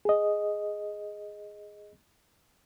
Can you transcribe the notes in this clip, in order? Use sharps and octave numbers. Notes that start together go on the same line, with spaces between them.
G#4 D#5